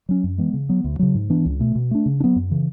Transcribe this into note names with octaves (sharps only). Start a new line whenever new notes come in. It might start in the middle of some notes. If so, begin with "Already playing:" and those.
F#3 C#4
F#2
E3 G#3 B3
C#3
F#3 B3
D2
C#3 F#3
G#2
E3 B3 D4
C#2
B2 A3
B2
A3 D4
C#3
D4
F#3 B3
F#2
C#3 E3